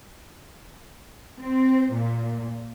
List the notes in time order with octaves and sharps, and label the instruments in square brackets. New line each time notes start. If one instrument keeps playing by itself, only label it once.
[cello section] C4
A#2